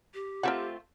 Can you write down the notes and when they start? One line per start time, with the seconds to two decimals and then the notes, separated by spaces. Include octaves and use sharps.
0.14 G4
0.43 A3 C4 F4 A#4 E5 F#5